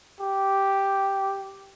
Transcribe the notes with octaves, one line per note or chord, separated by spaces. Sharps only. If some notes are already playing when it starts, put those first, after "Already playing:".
G4